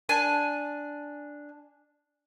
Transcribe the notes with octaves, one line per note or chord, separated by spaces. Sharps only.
D4 G#5 A5